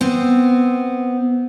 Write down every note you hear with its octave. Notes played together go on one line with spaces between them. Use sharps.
B3 C4